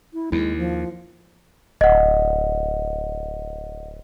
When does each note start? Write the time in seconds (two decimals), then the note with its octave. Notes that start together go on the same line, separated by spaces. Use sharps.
0.13 E4
0.32 D#2 G#3 E4
0.58 F3
1.81 D1 D#5 F#5